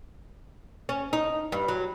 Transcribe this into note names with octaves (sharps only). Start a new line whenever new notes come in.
C#4
D#4
G2
F#3